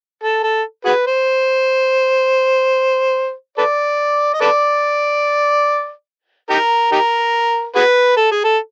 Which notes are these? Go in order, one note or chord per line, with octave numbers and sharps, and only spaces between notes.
A4
A4
F#4 G#4 B4
C5
A4 B4 D5
D#5
A4 B4 D5
D#4 G4 A#4
D#4 G4 A#4
F#4 G#4 B4
A4
G#4
A4